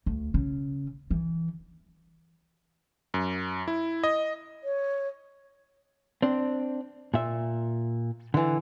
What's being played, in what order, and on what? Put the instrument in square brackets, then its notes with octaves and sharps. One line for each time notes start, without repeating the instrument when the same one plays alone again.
[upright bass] D2
C#3
E3
[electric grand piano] F#2
E4
D#5
[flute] C#5
[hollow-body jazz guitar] C4 D4
A#2 E5
D3 E3